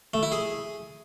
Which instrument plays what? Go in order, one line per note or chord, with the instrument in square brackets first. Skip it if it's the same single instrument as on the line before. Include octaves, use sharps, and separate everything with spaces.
[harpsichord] A3
E4
G#4